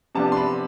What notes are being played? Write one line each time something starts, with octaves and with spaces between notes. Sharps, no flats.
C3 F3 B3 D4 A5
C6
B5